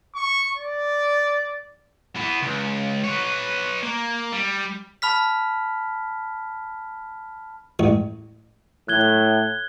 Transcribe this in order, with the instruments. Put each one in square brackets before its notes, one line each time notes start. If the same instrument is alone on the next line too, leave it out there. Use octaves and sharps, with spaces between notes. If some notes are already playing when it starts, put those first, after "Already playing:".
[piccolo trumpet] C#6
D5
[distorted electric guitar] E3 B3
C#2
B4 C#5
A#3
G3
[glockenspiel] A5 B5 F6 B6
[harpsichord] A1
[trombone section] A2 [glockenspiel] F#6 G#6 G7